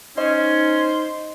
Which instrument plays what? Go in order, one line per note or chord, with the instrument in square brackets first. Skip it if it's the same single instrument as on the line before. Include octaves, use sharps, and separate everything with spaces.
[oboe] C#4 [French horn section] D#4 [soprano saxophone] C5 [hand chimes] D#5